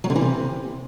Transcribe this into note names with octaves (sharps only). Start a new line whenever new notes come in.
F#3
D3
E3
C3